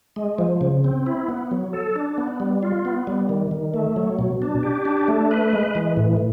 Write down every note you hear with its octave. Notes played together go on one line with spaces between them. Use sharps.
G#3
F3
C#3
C4
E4
B3
F#3
A4
D4
B3
G3
F4
B3
G3
D#3
D#3
A3
F#3
B2
D4
G4
D4
A3
B4
G#3
E3
A2